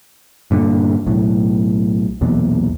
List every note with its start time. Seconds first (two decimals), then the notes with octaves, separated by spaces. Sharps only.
0.51 G2 A#2 D3
1.06 B1 A2
2.21 B1 E2 A#2